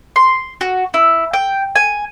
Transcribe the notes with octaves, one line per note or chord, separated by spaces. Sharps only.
C6
F#4
E4
G5
G#5